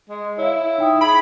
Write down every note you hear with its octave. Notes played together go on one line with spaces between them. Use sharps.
G#3
E4 C#5 F5
D#4 G5 D#6
G#4 B5 D7